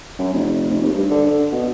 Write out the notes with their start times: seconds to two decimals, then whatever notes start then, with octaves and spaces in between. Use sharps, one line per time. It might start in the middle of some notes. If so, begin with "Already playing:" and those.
0.19 F#2
0.33 F1
0.70 F1
0.82 D#2
0.93 G2
1.10 D3
1.26 D3
1.52 B2